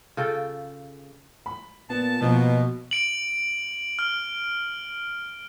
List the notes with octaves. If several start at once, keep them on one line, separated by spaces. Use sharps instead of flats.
C#3 F4 A4 G5
B5
A#2 B3 A5
B2 F3 A#3
D7 F#7
F6